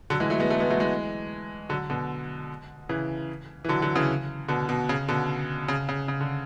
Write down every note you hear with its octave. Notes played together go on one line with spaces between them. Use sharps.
D3 F#3
E3 G#3
F#3 A3
G#3 B3
F#3 A3
G#3 B3
F#3 A3
E3 G#3
D3 F#3
B2 D3
C#3 E3
E3
D3 F#3
D3 F#3
C#3 E3
B2 D3
B2
C#3
B2 D3
C#3
C#3
C#3
D3